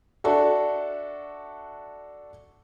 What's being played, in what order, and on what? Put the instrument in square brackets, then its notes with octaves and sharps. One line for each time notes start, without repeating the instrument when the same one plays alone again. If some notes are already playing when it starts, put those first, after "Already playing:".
[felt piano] D4 F#4 A4 D5 E5